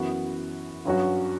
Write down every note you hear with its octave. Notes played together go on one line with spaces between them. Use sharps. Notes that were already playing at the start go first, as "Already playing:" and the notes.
Already playing: F#2 E3 B3 F#4
G2 F#3 C#4 F#4